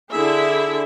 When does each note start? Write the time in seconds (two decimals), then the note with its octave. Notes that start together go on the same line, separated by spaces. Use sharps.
0.11 D3 E4 G#4 E5